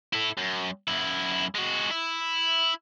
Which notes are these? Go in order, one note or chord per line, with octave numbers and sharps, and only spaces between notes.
E4 A4
F#2
F#2 E4
G#3 F#4
E4